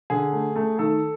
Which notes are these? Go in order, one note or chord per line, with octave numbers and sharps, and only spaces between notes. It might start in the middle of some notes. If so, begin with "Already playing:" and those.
D3 G#4
A3
A3
D#3 A4